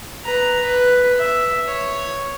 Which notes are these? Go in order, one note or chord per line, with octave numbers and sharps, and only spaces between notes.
B4 A#5
B4
E5
C#5